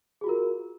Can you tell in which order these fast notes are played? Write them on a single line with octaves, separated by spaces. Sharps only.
G#4 F#4 F4 A#4